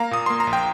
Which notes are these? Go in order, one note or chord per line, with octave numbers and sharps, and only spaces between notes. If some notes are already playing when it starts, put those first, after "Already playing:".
Already playing: A#3 F5 A#5
A#2 D#6
A#3 C6
A#5
A#1
G5